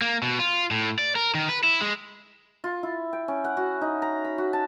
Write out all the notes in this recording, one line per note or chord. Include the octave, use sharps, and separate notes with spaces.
A#3
B2
F4
A2
D5
A#4
D#3
B4
E4
G#3
F4
E4
G5
C#4
F#5
F#4
D#4
A#5
B5
F#4
A5